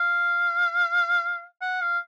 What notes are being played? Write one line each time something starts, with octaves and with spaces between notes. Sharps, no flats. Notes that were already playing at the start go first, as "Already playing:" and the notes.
Already playing: F5
F#5
F5